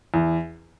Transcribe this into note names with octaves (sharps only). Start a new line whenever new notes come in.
E2